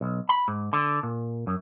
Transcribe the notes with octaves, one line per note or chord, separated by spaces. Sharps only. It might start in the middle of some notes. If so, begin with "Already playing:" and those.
B1
B5
G#2
D3
A#2
F#2